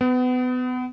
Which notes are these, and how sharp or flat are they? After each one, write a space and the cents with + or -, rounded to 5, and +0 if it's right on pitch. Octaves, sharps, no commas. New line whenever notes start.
B3 +30